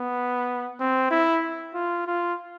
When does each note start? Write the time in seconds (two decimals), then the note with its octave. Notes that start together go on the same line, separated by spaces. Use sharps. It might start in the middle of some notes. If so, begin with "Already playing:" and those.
Already playing: B3
0.80 C4
1.11 E4
1.74 F4
2.07 F4